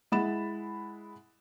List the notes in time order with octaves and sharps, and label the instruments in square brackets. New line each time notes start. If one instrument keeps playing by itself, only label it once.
[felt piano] G#3 E4 F#5 B5 A6 E7